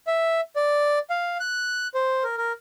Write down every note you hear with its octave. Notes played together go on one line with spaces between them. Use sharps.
E5
D5
F5
F#6
C5
A#4
A#4